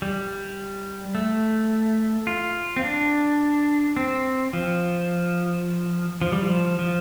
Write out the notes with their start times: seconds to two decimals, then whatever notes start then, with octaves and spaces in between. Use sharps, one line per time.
0.02 G3
1.15 A3
2.27 F4
2.76 C4
2.84 D4
3.97 C4
4.53 F3
6.21 F3
6.32 G3
6.43 F3
6.79 F3